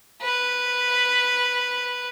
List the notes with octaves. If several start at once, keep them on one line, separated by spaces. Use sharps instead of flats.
B4